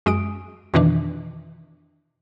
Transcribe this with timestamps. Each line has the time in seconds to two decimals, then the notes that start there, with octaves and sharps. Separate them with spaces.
0.06 F#2 G#3 D#6 D7
0.74 F2 B2 D#3 E3 D4